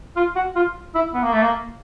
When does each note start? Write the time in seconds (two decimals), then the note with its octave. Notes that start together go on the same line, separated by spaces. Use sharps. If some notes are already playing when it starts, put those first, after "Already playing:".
0.16 F4
0.36 F#4
0.56 F4
0.95 E4
1.14 B3
1.23 A#3
1.33 A3
1.42 A#3